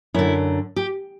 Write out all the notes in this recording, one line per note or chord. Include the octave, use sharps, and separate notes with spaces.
F#2 D3 E4
G4